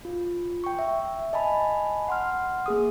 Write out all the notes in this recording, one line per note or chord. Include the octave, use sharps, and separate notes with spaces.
F4
G5 C#6
E5
D#5 G#5 A5 B5
F#5 C6 F6
A#3 G#4 D#6